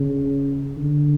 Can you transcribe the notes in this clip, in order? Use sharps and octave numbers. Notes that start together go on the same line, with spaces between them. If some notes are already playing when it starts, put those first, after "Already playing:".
Already playing: C#3
D3